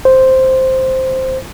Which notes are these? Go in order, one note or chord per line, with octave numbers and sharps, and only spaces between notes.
C5